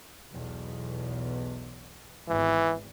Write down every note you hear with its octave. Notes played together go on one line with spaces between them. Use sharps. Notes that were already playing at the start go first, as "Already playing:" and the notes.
B1 E2 B2
G#1 E2 E3